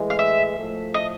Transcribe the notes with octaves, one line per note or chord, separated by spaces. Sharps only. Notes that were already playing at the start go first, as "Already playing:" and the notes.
Already playing: A2 E3 G#3
F5
E5
A2 F3 A3
D#5